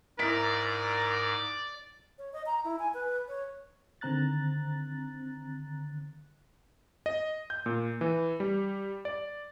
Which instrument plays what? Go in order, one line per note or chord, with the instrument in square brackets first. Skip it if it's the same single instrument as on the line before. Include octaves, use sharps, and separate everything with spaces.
[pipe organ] G#2 [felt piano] E4 B6 [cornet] A#4 [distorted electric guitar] D5
[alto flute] C#5
D#5
A#5
E4
G#5
B4
C#5
[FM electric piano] D3 D#3 C4 A#5 F#6 A6
[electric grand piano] D#5
G6
A#2
E3
G3
D5